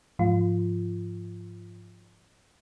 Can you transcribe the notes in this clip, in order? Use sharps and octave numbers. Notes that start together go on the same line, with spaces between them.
G#2 F3 F4